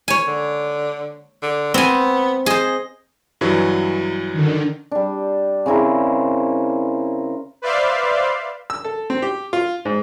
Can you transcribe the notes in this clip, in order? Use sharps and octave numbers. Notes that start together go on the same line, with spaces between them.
C#5 G#5
D3
D3
B3 C4 G#5
G#4 C5 D#5
G2 E3 F#3
D3 D#3
G3 D4
C#3 C4 E4 A#4
B4 C5 D5 E5 F5 C6
E6
A4
C4
G4
F4
G#2